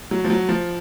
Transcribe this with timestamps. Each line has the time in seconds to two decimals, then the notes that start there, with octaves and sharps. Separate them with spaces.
0.11 F#3
0.24 F3
0.30 F#3
0.49 F3